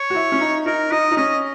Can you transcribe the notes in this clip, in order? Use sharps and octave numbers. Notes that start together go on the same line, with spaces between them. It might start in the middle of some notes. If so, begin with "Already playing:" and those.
Already playing: C#5
F#4
E4
C#4
D#4
D#4 A#4
D#4 D#5
D#4
C#4 D#5